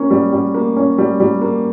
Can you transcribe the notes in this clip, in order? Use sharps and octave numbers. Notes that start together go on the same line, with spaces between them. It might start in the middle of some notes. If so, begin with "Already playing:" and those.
Already playing: A#3 C#4
G3
G3
A#3
C#4
G3
G3
A#3